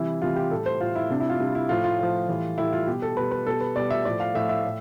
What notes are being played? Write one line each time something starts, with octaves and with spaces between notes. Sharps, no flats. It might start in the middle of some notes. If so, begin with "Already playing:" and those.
Already playing: C3 E3 G3 E4
C3 E3 G3 F4
G4
A2 G3 A4
C5
A2 G3 F4
E4
C3 G3 D4
E4
F4
C3 G3 D4
E4
A2 F3 F4
F4
A2 F3
A2 E3 G3
A2 E3 G3 E4
F4
B2 G3 G4
A4
B2 G3 B4
B4
B2 G3 A4
B4
B2 G3 D5
E5
A2 F3 D5
F5
A2 F3 E5
E5
A2